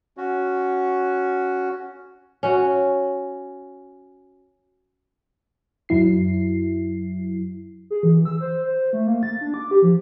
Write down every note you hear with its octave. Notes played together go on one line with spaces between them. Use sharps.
C#4 F#4
C#4 F#4
F#2 F#3 E4 C7
G#4
E3
E6
C5
C5
A3
A#3
A6
D4
D6
G4
F3